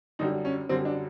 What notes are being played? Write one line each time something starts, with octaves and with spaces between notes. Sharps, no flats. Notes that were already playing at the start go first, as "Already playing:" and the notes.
F#2 D3 G3 D#4
C#4
F#2 D3 G3 C4
D4